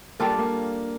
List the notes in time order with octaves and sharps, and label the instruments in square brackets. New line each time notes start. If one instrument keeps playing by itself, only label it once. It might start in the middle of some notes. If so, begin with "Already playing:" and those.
[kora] G3 D4 F4 A4 [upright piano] A#3
[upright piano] A#3